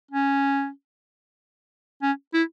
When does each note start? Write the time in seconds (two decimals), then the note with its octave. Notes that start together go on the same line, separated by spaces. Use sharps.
0.11 C#4
2.02 C#4
2.33 E4